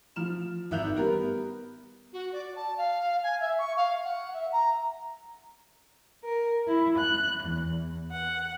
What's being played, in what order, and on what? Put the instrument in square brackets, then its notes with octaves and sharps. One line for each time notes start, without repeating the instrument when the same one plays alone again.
[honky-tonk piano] F3 F6 E7
G#1 E5 F#6 G6 F7
G3 B3 A#4
[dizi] F#4
D5
A5
F5
G#5
E5
C#6
F5
F#5
E5
A#5
[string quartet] A#4
E4
F#6
E2
F#5